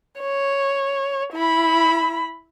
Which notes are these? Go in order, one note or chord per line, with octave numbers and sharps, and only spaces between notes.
C#5
E4 B5